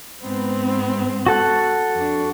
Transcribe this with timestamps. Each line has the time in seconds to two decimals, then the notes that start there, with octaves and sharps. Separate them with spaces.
0.24 G#2 B3 C4
1.26 F#4 A4 F#5
1.94 F2 D4